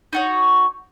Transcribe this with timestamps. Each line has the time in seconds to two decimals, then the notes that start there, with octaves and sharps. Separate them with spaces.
0.13 D#4 F#4 C#5